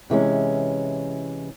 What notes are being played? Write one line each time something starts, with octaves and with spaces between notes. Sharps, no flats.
C3 E3 G#3 C#4